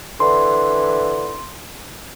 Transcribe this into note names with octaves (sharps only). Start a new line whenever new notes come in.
D3 E3 C6